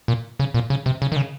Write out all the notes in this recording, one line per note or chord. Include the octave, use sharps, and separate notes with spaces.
A#2
C#3
A#2
C#3
C3
C#3
D#3
C#3